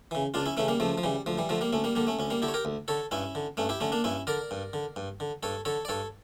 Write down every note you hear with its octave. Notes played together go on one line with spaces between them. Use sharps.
C#3 E3
C#2 D4 F4
C#4 E4
C#3 E3 A3 C#4
G3 A#3
C#2 F3 A3
F3
C#3 E3 G3
D2 F3
E3 G3
D3 F3 A3
G3 A#3
D2 A3 C#4
G3 A#3
D3 G3 A#3
A3 C#4
D2 C#4
G3 A#3
D3 E4 G4
C#5
G4 A#4
D2
D3 A4 C#5
G2 C#4 E4
D3
G2 A3 C#4
E4 G4
D3 A3 C#4
A#3 D4
G2 C#4 E4
D3 A#4 D5
G2
D3
G2
D3
G2 A4 C#5
D3 A4 C#5
D5
G2 A4 C#5